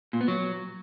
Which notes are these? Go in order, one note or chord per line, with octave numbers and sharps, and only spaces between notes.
A#2
B3
F#3